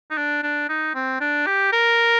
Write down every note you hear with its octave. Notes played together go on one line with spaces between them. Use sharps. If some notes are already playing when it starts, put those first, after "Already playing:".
D#4
D4
D4
D#4
C4
D4
G4
A#4